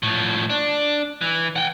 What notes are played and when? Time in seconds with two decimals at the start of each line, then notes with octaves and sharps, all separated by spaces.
0.03 A2 F3
0.50 D4
1.21 E3
1.56 F#5 G5